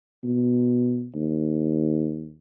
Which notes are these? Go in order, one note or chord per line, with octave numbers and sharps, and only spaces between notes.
B2
D#2